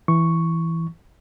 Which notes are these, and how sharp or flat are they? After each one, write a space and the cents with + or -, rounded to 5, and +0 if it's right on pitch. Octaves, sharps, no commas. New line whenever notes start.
E3 +0 C#6 +0